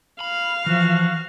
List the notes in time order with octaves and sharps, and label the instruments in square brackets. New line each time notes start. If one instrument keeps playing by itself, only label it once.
[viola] F5 [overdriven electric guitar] B5
[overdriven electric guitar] E3 [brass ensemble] F3 [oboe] F#4